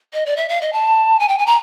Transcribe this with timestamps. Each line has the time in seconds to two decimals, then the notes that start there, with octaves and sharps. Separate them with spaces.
0.13 D#5
0.26 D5
0.36 E5
0.49 F5
0.61 D#5
0.73 A5
1.20 G#5
1.28 G5
1.38 G#5
1.46 A#5